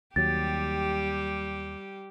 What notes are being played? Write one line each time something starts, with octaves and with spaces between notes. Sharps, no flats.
D#2 F#3 G3 G4 A6